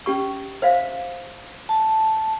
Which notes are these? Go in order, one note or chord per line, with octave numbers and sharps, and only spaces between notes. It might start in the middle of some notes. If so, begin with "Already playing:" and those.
C#4 G4 C#6
C5 E5 F5
A5